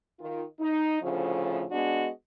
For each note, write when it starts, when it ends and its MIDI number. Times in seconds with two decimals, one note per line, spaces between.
0.18 0.43 51
0.18 0.43 65
0.60 0.98 63
1.01 1.65 38
1.01 1.65 45
1.01 1.65 49
1.01 1.65 53
1.71 2.08 56
1.71 2.08 59
1.71 2.08 62
1.71 2.08 66
1.71 2.08 75